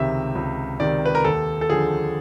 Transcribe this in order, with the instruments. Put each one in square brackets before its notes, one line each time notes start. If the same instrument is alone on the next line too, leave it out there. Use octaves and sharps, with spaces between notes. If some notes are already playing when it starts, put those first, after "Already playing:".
Already playing: [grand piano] C#2 C3 D#3 E5
C#2
C3 D#3 D5
B4
A#4
D#2 A4
A4
D3 F3 G#4